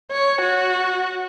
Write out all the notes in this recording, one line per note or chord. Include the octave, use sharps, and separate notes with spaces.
C#5
F#4